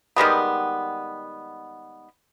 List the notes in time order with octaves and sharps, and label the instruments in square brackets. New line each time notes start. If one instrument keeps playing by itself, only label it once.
[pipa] D#3 G3 G#3 B3